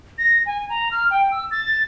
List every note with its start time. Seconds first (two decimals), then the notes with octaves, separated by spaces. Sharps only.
0.18 A#6
0.46 G#5
0.69 A#5
0.91 F6
1.11 G5
1.31 E6
1.51 A6